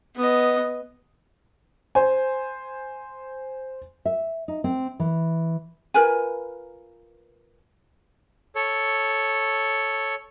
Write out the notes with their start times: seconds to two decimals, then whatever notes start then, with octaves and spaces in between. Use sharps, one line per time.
0.16 B3 D#5
1.95 C5 G#5
4.05 E5
4.48 D#4
4.64 C4
5.00 E3
5.94 F4 A#4 B4 G#5
8.56 A4 C#5